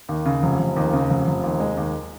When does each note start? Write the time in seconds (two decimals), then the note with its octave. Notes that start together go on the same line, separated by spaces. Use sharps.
0.09 D#2
0.25 C#3
0.43 F1
0.59 F1
0.76 D#2
0.93 C#3
1.10 F1
1.27 F1
1.43 D#2
1.60 G#3
1.77 D#2